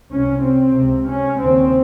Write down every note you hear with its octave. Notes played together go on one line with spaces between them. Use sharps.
C2 C3 C#4
C4
C#2 C3
C#4
D#2 C#3 C4